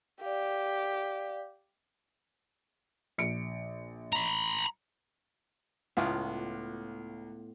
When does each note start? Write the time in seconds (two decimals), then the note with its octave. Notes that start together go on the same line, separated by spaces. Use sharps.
0.21 G4 D5 F5
3.18 A#1 C#7 D7
4.13 A#5 B5
5.97 C#2 A2 B3 F4